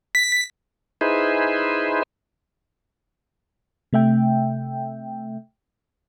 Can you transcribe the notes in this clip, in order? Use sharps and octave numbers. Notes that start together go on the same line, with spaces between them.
B6
D#4 E4 G#4 B4 C5
C3 A3 E5 G5